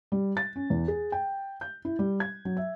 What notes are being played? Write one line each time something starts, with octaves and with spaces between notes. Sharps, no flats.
G3
A6
C#4
E2
G#4
G5
G6
E4
G3
G#6
F#3
E5